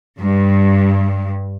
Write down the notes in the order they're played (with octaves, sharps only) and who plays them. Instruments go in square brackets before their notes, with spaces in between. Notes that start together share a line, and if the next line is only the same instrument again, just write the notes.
[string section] G2